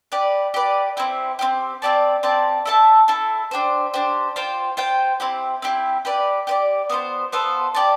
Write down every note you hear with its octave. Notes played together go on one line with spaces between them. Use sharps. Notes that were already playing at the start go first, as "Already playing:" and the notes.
G4 B4 D5
G4 B4 D5
C4 E4 G4
C4 E4 G4
C4 G4 D5 A5
C4 G4 D5 A5
E4 A4 E5 A5
E4 A4 E5 A5
D4 G4 C5
D4 G4 C5
F4 C5 G5
F4 C5 G5
C4 E4 G4
C4 E4 G4
G4 B4 D5
G4 B4 D5
B3 F4 A4 C5
B3 F4 A4 C5
G4 D5 A5